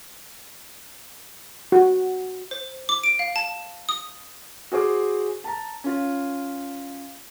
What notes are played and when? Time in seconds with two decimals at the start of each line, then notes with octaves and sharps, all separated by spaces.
1.72 F#4
2.51 C5
2.89 D6
3.04 D7
3.19 F5
3.36 A5
3.89 D#6
4.72 F#4 G#4 C5 D6
5.44 A5 A#5
5.84 C#4 F4